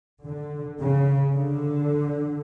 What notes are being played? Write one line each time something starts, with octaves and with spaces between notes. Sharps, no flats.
D3
C#3
D3